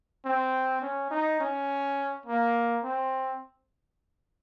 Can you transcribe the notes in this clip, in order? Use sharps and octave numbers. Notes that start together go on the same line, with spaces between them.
C4
C#4
D#4
C#4
A#3
C4